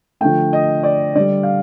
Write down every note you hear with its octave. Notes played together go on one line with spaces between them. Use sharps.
D3 F3 A3 G5
D#5
D5
D3 G3 D5
F5